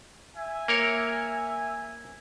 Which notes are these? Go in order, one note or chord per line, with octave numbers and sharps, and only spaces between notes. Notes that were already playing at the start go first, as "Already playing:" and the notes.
E5 G#5
A#3 A#4 C#5